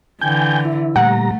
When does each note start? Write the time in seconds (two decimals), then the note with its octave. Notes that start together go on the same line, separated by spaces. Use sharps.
0.21 D3 E3 G5 G#5 G6
0.65 E4
0.96 A#2 G3 A3 F#5 A#5